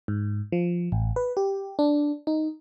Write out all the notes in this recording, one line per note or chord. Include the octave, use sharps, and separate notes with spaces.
G#2
F3
A1
B4
G4
D4
D#4